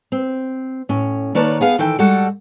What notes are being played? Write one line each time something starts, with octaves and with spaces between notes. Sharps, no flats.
C4
A2 C#4
D#3 A#3 B4 C#5 D5 A5
B3 G#4 F5
D#3 E3 A4 G5
G3 G#3 F#4 A4 F#5 A5